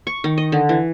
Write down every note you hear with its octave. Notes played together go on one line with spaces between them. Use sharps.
C#6
D#3
D#5
D3
E3